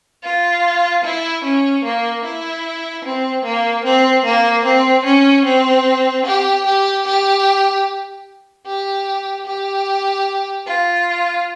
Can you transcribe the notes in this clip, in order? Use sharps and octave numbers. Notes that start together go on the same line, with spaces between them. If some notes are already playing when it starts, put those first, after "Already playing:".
F4
E4
C#4
A#3
E4
C4
A#3
C4
A#3
C4
C#4
C4
G4
G4
G4
G4
G4
F4